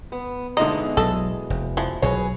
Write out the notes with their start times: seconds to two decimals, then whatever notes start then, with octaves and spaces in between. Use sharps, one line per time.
0.12 B3
0.57 E2 B2 D3 G#3 D#4 D#5 A#5
0.97 B1 F#3 A4 D#6
1.50 F1
1.77 E3 F3
2.02 B1 B2 F#3 G#4 A4 B4 C#5